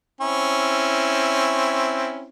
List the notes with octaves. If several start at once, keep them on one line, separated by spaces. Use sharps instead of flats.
C4 C#4 E4